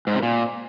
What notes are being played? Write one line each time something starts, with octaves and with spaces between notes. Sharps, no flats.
G#2
C3
A#2